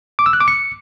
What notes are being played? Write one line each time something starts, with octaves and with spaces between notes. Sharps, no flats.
D6
E6
F#6
D6
C#7